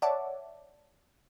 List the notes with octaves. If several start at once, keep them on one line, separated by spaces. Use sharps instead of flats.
C#5 D5 E5 F#5 A5 D6